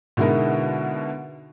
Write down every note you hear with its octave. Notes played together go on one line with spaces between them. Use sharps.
B2 D3 G#3 D#4 E4 A#4